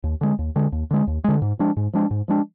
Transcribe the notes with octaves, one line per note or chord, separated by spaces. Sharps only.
D#2
D3 G#3
D#2
D3 G#3
D#2
D3 G#3
D#2
D3 G#3
G#2
F3 G#3 D4
G#2
F3 G#3 D4
G#2
F3 G#3 D4